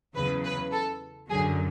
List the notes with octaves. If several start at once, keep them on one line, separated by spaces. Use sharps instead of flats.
E2 C#3 F#3 B4
B4
A4
F#2 D3 F#3 G#4